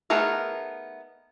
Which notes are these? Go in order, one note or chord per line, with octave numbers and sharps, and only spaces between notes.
A3 B3 D#4 G#4 A#4